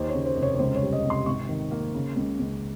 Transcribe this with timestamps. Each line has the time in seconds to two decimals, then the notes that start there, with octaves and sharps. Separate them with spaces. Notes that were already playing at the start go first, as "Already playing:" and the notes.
Already playing: D#2 C5
0.09 C#5
0.15 C#3
0.25 C5
0.37 F1
0.42 C#5
0.54 C#5
0.59 C#2 C5
0.76 C#5
0.82 G3
0.93 D#5
1.04 C3
1.10 C6
1.26 G#1 C#6
1.49 D#3
1.71 A#3
1.95 C#3
2.16 C#2
2.40 C#2